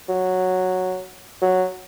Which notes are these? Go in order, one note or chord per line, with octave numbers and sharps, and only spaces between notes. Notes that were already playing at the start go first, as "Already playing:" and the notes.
F#3
F#3